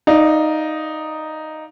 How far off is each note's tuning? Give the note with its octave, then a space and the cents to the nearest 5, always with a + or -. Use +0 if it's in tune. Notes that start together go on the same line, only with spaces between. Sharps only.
D#4 +0 D5 +20 F5 +0